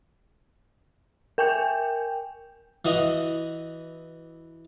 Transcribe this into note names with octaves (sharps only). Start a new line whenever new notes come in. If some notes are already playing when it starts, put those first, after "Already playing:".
A#4 G5 G#5 G6
E3 F#4 D#5